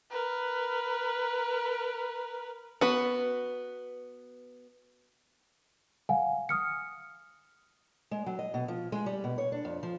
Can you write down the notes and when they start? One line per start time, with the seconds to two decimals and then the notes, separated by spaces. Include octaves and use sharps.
0.10 A#4 B4
2.81 B3 F#4 B4
6.09 F5 F#5 G#5
6.49 D#6 F6 C#7
8.11 G#3
8.26 F#3
8.39 D#5
8.54 B2
8.68 F3
8.92 G#3
9.06 G3
9.24 B2
9.38 C#5
9.52 D4
9.65 F2
9.83 F3